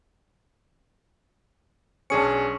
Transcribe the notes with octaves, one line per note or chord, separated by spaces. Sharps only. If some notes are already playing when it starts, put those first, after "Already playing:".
B1 C#4 D4 G#4 C#7